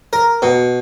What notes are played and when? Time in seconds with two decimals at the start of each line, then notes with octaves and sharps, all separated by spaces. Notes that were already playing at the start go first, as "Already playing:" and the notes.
0.13 A#4
0.42 B2